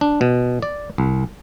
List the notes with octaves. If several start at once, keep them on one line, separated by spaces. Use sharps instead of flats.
D4
B2
D5
C2